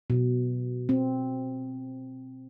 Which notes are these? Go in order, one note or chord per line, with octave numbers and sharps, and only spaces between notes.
B2
C4